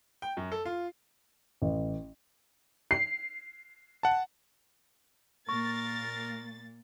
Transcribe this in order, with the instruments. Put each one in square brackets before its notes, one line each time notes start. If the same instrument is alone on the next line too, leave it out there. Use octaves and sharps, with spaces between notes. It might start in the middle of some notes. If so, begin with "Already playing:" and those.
[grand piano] G5
F#2
A4
F4
[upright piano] A1
[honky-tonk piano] C7
[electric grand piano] F#5 A5
[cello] A#2 A#3 [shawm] A#4 [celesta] C#6 [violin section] A6